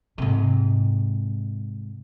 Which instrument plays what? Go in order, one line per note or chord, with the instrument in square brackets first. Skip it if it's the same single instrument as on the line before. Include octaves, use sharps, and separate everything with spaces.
[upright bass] G#2 C3